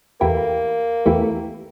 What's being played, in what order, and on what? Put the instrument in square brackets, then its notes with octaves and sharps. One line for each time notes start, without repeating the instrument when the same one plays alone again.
[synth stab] E2 E3 A3 E4 G4 [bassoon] A#3
[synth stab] E2 E3 A3 E4 G4